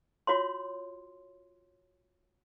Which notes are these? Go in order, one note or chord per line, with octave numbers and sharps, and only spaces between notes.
F4 F#4 C#5 C6